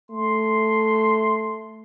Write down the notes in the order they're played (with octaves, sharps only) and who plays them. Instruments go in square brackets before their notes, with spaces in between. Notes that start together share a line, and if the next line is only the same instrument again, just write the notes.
[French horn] A3 [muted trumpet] C6